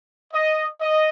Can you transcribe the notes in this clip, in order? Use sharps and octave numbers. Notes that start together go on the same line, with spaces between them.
D#5
D#5